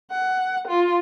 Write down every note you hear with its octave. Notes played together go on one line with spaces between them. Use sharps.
F#5
F4